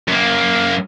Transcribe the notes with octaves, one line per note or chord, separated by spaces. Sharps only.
F#2 A#3